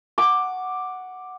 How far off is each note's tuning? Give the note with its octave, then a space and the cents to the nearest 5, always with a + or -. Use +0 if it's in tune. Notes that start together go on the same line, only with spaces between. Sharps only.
F#5 +0 D6 +5